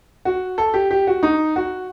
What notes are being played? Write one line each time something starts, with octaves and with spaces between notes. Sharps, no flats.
F#4
A4
G4
G4
F#4
D#4
F#4